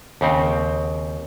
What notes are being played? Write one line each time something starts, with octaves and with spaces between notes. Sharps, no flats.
D#2 C#3 C4